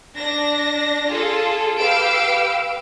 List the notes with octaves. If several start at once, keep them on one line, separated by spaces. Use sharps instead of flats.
D4 A#6
F4 G#4 A4
G4 B4 F5 E6 D7